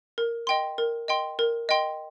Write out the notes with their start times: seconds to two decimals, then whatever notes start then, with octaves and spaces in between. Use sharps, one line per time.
0.18 A#4
0.47 D#5 G5 C6
0.78 A#4
1.08 D#5 G5 C6
1.39 A#4
1.69 D#5 G5 C6